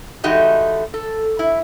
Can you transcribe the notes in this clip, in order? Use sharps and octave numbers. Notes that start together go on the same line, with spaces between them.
E3 G#3 A3 D#4 F#4 G4
A4
E4